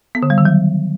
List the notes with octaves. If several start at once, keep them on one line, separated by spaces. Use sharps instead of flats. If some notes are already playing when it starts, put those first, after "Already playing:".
B3
D3
G3
D#3
F#3